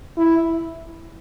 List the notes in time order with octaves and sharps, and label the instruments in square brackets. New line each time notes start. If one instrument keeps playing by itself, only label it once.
[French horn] E4